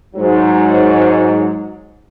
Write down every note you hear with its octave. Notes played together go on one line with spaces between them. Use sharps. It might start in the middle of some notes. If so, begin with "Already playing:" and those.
G#2 F#3